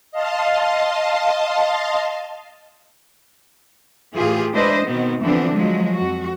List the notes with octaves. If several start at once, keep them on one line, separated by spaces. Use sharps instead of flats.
D#5 F5 A5 C6
A2 E3 F4 G4 G#4
G#3 D4 E4 B4 C5 D#5
B2 D#3 B3 C4
D3 E3 F3 B3 C4 D4
F3 F#3 G#3
F2 F#4